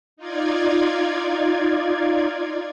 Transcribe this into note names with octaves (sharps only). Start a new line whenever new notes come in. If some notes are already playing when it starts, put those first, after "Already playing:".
D#4 F4 D5 G#6